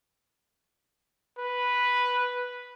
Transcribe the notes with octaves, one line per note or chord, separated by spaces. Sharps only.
B4